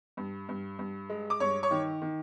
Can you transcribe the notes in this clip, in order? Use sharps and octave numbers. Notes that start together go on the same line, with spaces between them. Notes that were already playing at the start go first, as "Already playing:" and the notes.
G2
G2
G2
G#3
D6
G2 C#5 C#6
C#5 C#6
D#3
D#3